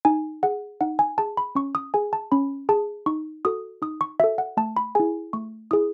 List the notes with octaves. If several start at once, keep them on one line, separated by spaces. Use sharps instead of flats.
D#4 G#5
G#4 F#5
D#4 F#5
G#5
G#4 A5
B5
C#4 C#6
D#6
G#4 G#5
A5
C#4 B5
G#4 A5
D#4 C#6
F#4 A4 D#6
D#4 D#6
C#6
F#4 A4 E5
F#5
A3 A5
B5
E4 G#4 G#5
A3 C#6
E4 G#4 D#6